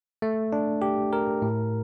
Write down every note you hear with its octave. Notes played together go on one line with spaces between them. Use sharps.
A3
D4
G4
A#4
A2